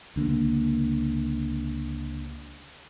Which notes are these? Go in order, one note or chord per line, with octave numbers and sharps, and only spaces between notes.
C#2 D3 A#3